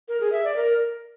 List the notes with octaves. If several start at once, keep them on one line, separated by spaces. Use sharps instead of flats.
A#4
G#4
E5
D5
A#4